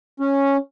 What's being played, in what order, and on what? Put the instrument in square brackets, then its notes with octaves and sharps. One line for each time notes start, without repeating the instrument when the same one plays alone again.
[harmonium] C#4